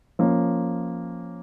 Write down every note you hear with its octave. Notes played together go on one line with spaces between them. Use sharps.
F3 A#3 C#4